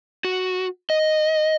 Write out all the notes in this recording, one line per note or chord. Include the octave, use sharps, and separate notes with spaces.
F#4
D#5